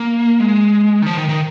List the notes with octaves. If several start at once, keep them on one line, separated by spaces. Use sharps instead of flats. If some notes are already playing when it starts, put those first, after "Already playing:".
Already playing: A#3
G#3
D#3
F3
D#3
D#3